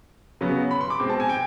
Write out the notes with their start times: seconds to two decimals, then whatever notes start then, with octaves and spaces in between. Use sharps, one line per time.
0.41 C#3 F#3 B3
0.71 B5
0.81 C6
0.90 D6
1.00 B2 G#3 C4
1.10 A5
1.20 G#5
1.29 G5